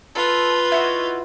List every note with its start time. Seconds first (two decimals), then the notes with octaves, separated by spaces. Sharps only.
0.15 F4 A4 B4
0.72 E4 F#4 D#5